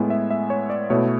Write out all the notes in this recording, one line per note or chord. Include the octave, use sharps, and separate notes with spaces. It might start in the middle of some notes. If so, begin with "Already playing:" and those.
Already playing: A2 G#3 B3 E4 G#5
E5
E5
C#5
D5
B2 A3 E4 C#5